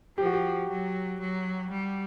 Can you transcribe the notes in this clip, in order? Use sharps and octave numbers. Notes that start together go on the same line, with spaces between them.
F3 G4
F#4
G4
F#3
F#3
G3